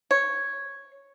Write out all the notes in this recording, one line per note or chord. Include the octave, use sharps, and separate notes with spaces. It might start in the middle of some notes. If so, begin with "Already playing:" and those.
C#5